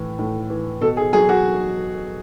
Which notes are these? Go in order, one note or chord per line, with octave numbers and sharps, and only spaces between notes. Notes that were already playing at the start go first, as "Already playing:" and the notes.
Already playing: A2 E3
A2
E3
B2 A4
G#4
F#3 G#4
F#4